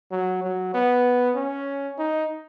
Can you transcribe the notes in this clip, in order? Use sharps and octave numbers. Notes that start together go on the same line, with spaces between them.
F#3
F#3
B3
C#4
D#4